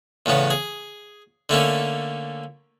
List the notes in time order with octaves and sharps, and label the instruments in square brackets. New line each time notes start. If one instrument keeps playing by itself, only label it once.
[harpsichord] E2 A2 C#3 B3
G#4
D3 A3 A#3 C#4